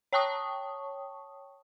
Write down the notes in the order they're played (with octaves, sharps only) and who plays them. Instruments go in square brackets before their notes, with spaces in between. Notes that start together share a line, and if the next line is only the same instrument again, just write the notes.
[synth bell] C#5 G5 A5 C#6 D#6